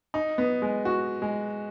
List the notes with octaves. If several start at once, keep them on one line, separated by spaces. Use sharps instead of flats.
D#4
B3
G#3
F#4
G#3